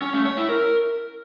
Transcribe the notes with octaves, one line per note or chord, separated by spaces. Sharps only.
C#4
A3
C#5
E4
A#4